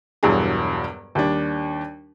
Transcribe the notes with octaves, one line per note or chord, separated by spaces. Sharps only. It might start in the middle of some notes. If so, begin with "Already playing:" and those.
E1 E2 G2 F#3 G#4
D#2 G3 D4